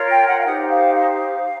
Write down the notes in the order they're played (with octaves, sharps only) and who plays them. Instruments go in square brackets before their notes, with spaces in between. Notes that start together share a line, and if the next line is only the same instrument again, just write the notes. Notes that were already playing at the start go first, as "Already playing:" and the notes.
Already playing: [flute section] F4 A#4 C#5
G5
F#5
F5
D#4 G4 C5 F#5
F5
F5